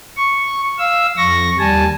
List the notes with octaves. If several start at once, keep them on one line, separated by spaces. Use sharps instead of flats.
C#6
F5 E6
F2 C#6 A#6
D#2 G3 G#5 A5